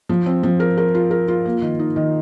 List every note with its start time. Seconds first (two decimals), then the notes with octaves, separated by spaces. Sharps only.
0.09 F3
0.26 C4
0.43 F3
0.60 A#4
0.78 A#4
0.95 F4
1.11 A#4
1.28 F4
1.45 A#3
1.62 D#3
1.79 D#4
1.96 D#3